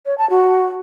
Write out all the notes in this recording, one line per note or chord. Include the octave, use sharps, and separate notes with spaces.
C#5
A5
F#4